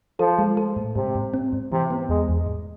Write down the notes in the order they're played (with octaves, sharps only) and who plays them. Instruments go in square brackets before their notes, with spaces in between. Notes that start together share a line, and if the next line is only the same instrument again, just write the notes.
[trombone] F3 [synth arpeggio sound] A4
[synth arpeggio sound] G#3
A4
A2
[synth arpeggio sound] G#2 [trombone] C3
[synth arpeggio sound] G#2
C4
G#2
[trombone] C3 [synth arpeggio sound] E3
[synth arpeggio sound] B3
[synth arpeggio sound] E2 [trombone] G#3
[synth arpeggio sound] E2
G#2